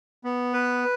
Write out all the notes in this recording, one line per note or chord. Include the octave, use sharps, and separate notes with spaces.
B3
B4